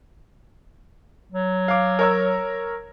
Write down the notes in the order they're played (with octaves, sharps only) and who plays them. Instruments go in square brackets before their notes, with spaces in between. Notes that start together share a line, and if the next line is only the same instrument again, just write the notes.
[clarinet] F#3
[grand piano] F5 D6
A#4 C#5 E6